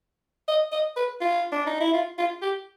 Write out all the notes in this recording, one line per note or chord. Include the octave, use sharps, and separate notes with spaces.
D#5
D#5
B4
F4
D4
D#4
E4
F4
F4
G4